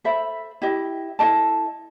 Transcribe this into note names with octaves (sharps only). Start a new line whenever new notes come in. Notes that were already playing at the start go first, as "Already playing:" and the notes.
A4 C5 E5 B5
E4 G4 D#5
E4 A4 D#5 A5